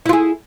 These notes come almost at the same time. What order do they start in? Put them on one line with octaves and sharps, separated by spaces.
E4 F4 G#4